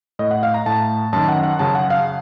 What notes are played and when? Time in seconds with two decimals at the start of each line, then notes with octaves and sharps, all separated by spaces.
0.19 A2 D#5
0.31 F#5
0.43 F5
0.54 A#5
0.66 A2 A5
1.13 F#2 D#3 A5
1.28 F#5
1.43 F#5
1.59 F#2 C#3 A5
1.75 F#5
1.90 F5